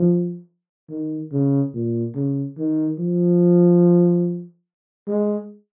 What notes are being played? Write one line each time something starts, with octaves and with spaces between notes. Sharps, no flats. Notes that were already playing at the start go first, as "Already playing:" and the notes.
Already playing: F3
D#3
C#3
A#2
C#3
D#3
F3
G#3